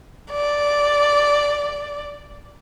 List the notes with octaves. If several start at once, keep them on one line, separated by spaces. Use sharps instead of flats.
D5